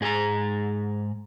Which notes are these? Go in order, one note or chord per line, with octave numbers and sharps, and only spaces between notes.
G#2 G#4 G5 G#5 A#5